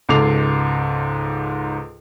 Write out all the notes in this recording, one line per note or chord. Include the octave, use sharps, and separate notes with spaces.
C#2 G#2 A4 D6 C7 F7